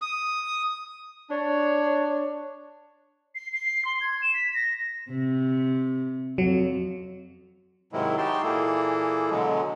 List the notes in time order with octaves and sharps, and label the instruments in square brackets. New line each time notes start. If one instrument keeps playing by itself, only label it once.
[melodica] D#6
[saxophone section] D4 C#5
[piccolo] C7
C7
C6
G#6
E7
B6
A#6
[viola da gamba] C3
[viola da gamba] F2 [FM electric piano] F#3
[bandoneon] G#2 C3 D#3 F#3 G#3 E4
D#4 F#4 G4 G5 A5 C6
A#2 E3 A#3 E4 G#4 A4
B2 D3 F#3 G#3